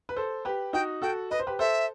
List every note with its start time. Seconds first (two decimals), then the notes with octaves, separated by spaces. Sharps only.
0.09 B4
0.16 A4 C5
0.45 G4 B4
0.73 D#4 F#4 G5
1.02 F#4 A4 G5
1.30 B4 D#5
1.39 C5
1.47 G4 B4
1.59 A4 C5 E5